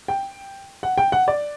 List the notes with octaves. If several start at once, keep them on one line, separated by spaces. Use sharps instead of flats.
G5
F#5
G5
F#5
D5